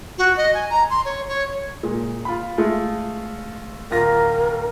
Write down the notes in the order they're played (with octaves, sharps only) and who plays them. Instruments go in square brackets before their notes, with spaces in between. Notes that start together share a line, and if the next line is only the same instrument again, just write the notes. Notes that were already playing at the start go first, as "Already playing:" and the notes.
[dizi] F#4
D#5
G#5
A#5
C6
C#5
C#5
[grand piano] A#2 G#3
F4 B5
G#3 A3 F4
[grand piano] D1 F4 A#6 [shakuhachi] A#4